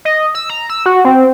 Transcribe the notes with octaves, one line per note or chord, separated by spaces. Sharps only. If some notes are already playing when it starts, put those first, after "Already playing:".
D#5
E6
A#5
E6
F#4
C4